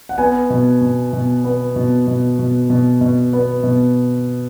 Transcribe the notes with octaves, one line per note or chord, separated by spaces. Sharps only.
F#5
B3 G#5
B2
B2
B2
B3
B2
B2
B2
B2
B2
B3
B2